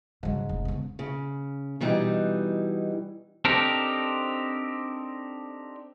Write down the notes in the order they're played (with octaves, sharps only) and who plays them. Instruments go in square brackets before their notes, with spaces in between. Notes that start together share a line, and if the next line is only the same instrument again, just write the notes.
[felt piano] G#2 [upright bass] C#3 F#3
[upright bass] F1
C#3 B3
[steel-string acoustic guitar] C#3
B2 E3 G3 D#4
[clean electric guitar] C4 D4 D#4 G4 A4 A#4